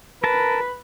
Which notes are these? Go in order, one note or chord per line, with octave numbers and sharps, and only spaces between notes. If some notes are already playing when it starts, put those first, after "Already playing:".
A#4 B4 A5